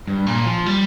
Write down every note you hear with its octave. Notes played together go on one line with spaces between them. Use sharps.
G2
A#2
F3
G3